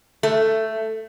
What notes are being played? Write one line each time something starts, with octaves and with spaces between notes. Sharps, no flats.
A3